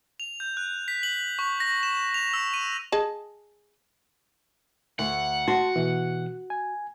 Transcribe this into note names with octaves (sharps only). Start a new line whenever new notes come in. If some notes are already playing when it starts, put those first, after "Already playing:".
F7
G6
F#6
B6
F#7
C#6
A#6
E7
F7
E6
D#7
G#4 D#5 A5
D2 F#5
F#4 A5 C6
B2 E3
G#5